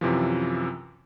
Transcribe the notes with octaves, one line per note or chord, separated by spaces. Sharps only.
F#2 C3 E3 F3